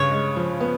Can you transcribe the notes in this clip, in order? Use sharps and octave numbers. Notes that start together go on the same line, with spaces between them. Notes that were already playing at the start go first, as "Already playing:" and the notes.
Already playing: G2 C#3 C#5
G#3
F3
B3